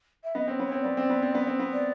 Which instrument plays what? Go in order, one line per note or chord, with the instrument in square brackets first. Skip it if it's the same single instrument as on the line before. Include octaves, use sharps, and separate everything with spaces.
[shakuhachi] E5
[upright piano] B3 [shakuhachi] D#5
[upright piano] C4 [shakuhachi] C#5
[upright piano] B3
[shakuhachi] C#5
[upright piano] C4
[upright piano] B3 [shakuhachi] D5
[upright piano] C4
B3
C4
B3
C4
B3
[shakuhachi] D5